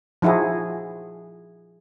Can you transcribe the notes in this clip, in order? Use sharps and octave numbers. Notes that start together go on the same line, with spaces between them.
F3 D#4 E4 F#4 G#4